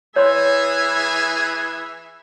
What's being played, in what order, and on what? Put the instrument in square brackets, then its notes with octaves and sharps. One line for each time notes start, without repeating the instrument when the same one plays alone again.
[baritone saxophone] E3 [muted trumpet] G#4 [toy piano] C#5 C6 [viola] E5